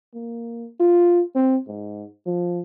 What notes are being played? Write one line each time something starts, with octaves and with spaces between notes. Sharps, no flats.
A#3
F4
C4
G#2
F3